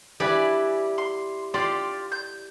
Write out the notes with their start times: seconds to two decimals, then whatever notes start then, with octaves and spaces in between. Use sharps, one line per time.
0.20 G3 E4 B4 D5 G#5
0.98 C6
1.54 F4 G4 D5 C6
2.12 G6